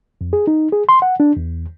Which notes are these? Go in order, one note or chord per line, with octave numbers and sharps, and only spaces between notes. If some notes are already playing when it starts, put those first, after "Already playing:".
F2
G#4
D#4
G#4
C6
F#5
D4
E2